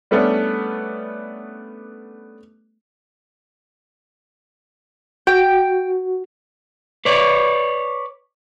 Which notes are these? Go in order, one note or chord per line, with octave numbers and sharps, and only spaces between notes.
G3 A3 B3 C#4 D4
F#4 G5
B4 C#5 D5